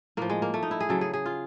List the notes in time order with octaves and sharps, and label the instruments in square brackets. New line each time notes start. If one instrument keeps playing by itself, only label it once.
[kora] A2 F3 A#3
G#3
A#3
A3
D#4
E4
G#4
C#3 F#3 A4
G#4
G#4
F4